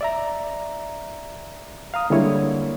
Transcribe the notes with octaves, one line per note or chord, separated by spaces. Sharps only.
D5 E5 A#5
F5 A#5 D#6
D3 G3 G#3 A#3 E4 C#5